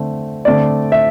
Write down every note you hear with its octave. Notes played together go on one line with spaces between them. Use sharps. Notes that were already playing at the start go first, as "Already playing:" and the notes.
Already playing: D3 A3 C4
D3 A3 C4 D5
E5